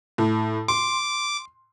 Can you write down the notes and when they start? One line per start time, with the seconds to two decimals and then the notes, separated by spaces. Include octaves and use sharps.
0.18 A2
0.68 C6 D6